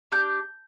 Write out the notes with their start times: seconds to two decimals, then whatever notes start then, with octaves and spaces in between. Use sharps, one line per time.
0.12 D4 G4 G6